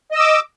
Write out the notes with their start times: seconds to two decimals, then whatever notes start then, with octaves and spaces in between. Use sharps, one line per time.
0.11 D#5
0.16 E6
0.20 D6